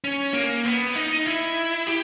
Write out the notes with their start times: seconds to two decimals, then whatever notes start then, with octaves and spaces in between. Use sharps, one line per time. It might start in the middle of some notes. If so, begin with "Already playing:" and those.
0.04 C#4
0.34 A#3
0.65 B3
0.95 D#4
1.26 E4
1.87 G4